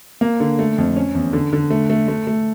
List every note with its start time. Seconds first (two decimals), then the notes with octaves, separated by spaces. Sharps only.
0.21 A#3
0.40 D3
0.59 A3
0.78 F2
0.96 C#4
1.15 E2
1.33 D3
1.53 D3
1.70 A3
1.90 A3
2.08 A3
2.27 A3